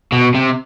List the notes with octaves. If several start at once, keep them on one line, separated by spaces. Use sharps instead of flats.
B2
C3